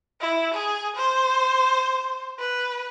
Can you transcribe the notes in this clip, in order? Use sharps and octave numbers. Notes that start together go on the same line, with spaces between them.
E4
G#4
C5
B4